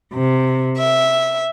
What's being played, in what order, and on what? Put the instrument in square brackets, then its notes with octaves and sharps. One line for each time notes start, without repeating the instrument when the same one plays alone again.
[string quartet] C3
E5